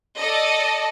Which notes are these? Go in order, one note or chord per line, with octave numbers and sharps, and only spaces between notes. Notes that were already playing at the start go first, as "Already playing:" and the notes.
A4 D5 D#5